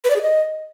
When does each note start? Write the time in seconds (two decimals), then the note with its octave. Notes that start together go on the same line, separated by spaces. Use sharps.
0.04 B4
0.10 D5
0.16 G#4
0.22 D#5